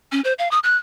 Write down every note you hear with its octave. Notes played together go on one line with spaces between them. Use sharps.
C#4
C5
F5
D#6
F#6